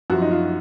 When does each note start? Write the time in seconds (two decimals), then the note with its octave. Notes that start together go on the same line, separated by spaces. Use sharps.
0.10 F#2 F3 F#4
0.22 D#4
0.31 F4